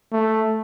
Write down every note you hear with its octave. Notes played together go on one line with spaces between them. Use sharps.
A3